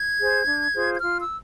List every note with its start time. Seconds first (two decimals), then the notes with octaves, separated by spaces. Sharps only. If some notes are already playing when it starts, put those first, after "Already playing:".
Already playing: G#6
0.19 G#4 C5
0.46 D4
0.74 F4 G#4 C5
0.95 G#6
1.01 F4 F6
1.19 E6